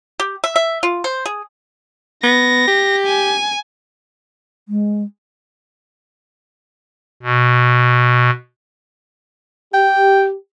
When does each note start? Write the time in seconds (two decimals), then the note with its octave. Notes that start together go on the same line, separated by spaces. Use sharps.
0.20 G4
0.44 E5
0.56 E5
0.83 F4
1.04 C5
1.26 G#4
2.24 B3 A#6
2.68 G4
3.06 G#5
4.69 G#3
7.23 B2
9.74 G4 G5